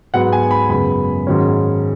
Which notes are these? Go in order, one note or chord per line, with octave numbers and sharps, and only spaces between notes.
G#2 F#3 B3 F#5
G#5
B5
F#2 C#3 G#3 B3 B5
G#2 D#3 F#3 C#4